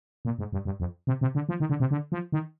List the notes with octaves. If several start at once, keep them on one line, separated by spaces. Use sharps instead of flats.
A#2
G#2
G2
G2
F2
C3
C3
D3
F3
D#3
D3
C3
D3
F3
D#3